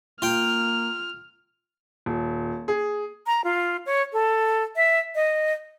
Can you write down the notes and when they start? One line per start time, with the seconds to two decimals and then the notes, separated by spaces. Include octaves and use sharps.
0.22 A#3 F4 G5 F6
2.06 D#1
2.68 G#4
3.27 A#5
3.44 F4
3.86 C#5
4.13 A4
4.76 E5
5.15 D#5